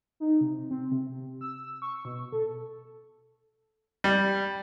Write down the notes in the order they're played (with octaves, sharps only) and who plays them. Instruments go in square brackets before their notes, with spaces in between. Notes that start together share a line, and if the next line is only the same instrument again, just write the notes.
[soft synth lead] D#4
C3
C4
C3
E6
C#6
B2
A4
[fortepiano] G3